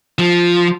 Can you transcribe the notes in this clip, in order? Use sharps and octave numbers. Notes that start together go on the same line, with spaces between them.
F3